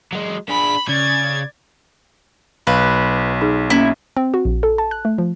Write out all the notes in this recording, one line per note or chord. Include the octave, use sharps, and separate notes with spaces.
F#3 G#3
D4 G#4 B5
C#3 D5 G#6 A6
B1 B4 F5
D#4 G#4
A#3 C#4 E4
C4
F#4
A#1
A4
A5
F#6
A3
F3